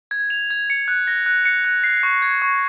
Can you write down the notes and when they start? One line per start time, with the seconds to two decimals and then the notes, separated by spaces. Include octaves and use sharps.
0.11 G#6
0.30 F7
0.50 G#6
0.70 C#7
0.88 F#6
1.07 A#6
1.26 F#6
1.45 C#7
1.64 F#6
1.84 C7
2.03 C#6
2.22 G#6
2.42 C#6